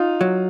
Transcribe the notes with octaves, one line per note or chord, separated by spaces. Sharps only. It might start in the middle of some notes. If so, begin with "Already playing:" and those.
Already playing: D#4 F4
F#3